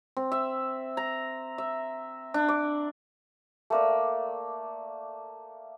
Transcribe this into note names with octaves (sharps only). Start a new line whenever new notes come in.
C4
E5
A#5
E5
D4
D6
A3 A#3 D5